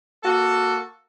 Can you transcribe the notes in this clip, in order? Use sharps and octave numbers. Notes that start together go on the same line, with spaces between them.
A#3 F#4 A4